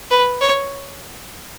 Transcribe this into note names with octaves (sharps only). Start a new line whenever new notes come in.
B4
C#5